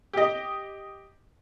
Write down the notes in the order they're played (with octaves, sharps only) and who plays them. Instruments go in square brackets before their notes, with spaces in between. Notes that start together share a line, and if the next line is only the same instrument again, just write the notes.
[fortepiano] G4 D#5